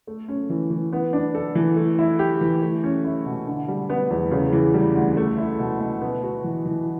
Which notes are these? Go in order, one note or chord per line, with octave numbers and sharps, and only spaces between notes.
A3
C#4
E3
E3
B3
D4
A4
E3
A3
E4
G4
E3
A3
C#4
E4
B2
D3
G3
B3
E2
C#3
E3
G3
D2
A3
E4
B2
B2
B3
F#4
E3
E3